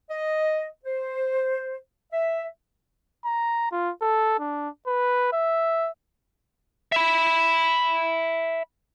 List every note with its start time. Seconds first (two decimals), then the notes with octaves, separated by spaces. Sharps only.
0.10 D#5
0.85 C5
2.13 E5
3.25 A#5
3.72 F4
4.02 A4
4.39 D4
4.87 B4
5.33 E5
6.92 E5 B5